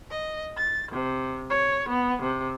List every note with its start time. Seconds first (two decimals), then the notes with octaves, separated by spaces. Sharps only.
0.11 D#5
0.56 A6
0.91 C3
1.49 C#5
1.88 B3
2.22 C3